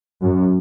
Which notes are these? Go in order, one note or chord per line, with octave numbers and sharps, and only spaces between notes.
F#2